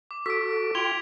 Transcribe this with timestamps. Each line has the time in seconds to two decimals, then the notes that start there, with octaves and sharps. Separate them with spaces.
0.11 D6
0.26 F#4 A4 B6 D7
0.75 F4 G5 C6 G#6 F7